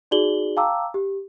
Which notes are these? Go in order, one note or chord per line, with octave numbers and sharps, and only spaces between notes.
D#4 F#4 G#4 D5 F#7 G7
F5 G5 A5 A#5 D6 E6
G4